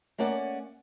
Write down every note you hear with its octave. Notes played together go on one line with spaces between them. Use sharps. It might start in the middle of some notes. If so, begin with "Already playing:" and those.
A3 A#3 C#4 D5 F#5